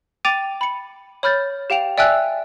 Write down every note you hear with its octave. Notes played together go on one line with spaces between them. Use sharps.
G5 D6 A6 D#7 F7
B5 C#7
C#5 B5 F6 G6 A6
G4 F5 G5 F7
D5 E5 G5 G#5 E6 F#6